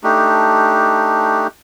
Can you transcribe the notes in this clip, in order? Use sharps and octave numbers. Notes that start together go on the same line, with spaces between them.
A3 D4 D#4 G4